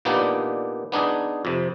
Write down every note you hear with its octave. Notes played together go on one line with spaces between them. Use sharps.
A#2 A#3 B3 D4 D#4 G4
B3 D4 D#4 G#4
F2 C3